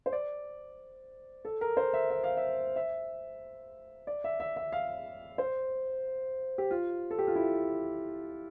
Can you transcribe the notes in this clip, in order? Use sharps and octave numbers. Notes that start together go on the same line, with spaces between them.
C5
D5
A4
A#4
C5
E5
E5
F5
E5
E5
D5
E5
E5
E5
F5
C5
G4
F4
A4
G4
F4
E4